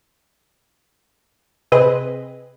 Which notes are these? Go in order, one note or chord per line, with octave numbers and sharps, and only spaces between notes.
C3 C4 G#4 B4 D#5